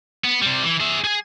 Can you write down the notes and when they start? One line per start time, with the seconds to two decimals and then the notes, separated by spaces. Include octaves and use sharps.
0.24 B3
0.42 C3 G3
0.63 E3
0.80 G#4 E5
1.04 G#4 G#5